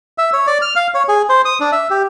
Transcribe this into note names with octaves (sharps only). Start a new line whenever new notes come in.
E5
C#5
D5
F6
F5
C#5
G#4
C5
D#6
D4
E5
G4